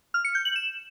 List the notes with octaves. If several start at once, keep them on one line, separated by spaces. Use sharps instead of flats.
F6
C#7
G6
F#7
E7